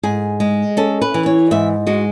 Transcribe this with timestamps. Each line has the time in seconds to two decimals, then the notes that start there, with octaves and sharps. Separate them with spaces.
0.03 G#2 G#4
0.40 G#3
0.77 C#4 A4
1.01 B4
1.14 E3
1.26 C#5
1.51 G#2 E5
1.87 G#3 F#4